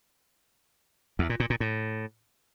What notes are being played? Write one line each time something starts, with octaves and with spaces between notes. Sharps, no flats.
E2
A#2
A#2
A#2
A2